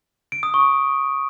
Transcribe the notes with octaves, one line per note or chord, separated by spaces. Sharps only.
D7
D#6
C#6